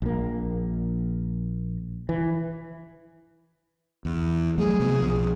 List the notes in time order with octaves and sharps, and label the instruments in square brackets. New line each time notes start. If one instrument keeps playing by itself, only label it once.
[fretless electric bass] A#1 A#3
E3
[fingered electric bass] E2
[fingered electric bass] F#3 G3 A3 [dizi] G#4
[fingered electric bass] C3 B3
B1 F3